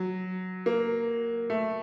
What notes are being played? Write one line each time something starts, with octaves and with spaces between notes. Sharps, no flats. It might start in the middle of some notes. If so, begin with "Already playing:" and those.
Already playing: F#3
A#3
A3